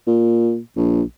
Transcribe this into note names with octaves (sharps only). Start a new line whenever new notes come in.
A#2
A#1